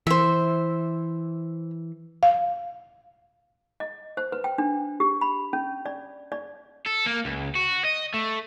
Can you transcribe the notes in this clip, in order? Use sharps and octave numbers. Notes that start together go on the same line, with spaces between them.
E3 C5 E5
F5
D#5
C5
B4
G5
D4
G4
B5
C#4
D5
D5
A4
A#3
C#2
F#4
D#5
A3